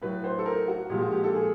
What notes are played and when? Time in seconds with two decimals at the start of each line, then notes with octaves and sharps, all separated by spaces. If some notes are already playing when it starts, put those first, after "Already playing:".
0.02 A2 F#3 B4
0.24 C5
0.39 A4
0.46 A#4
0.68 F#4
0.89 A#2 F3 G#3 G4
1.01 F#4
1.12 G4
1.24 A4
1.34 G#4